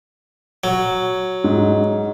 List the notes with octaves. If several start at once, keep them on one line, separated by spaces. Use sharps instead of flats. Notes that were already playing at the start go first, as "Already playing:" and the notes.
F#3
G#2